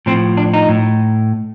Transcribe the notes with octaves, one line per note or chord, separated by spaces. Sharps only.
A2 F3 C4
D4
D#4
A2